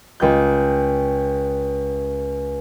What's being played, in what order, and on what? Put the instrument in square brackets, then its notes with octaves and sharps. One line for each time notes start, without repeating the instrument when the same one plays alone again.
[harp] C#2 G5 G6